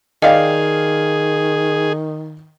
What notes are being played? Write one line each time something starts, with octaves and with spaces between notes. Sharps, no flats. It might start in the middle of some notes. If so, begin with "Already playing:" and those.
D#3 G#4 D5 D#5 F5 G5